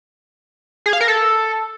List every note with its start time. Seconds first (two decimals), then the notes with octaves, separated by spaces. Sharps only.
0.86 G#4
0.93 F5
1.01 A#4
1.08 A4